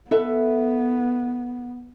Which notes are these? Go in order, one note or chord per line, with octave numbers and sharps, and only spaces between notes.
B3 A4 B4 E5